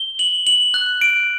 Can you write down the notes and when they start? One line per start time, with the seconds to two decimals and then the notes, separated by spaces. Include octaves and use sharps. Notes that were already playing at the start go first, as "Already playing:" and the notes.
Already playing: G7
0.19 F#7
0.47 F#7
0.74 F#6
1.01 D7